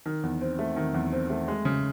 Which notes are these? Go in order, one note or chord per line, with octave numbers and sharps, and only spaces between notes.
D#3
E2
C4
A3
D#3
E2
C4
A3
G#3
C#3